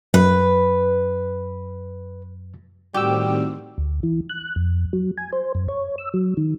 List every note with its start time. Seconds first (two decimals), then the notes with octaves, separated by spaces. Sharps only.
0.14 F#2 B4
2.94 A2 D#3 G3 C4 F#4 G4 E6
3.78 D2
4.03 E3
4.30 F#6
4.56 F2
4.93 F#3
5.18 G#5
5.33 C5
5.55 F#2
5.68 C#5
5.98 E6
6.14 F#3
6.37 D#3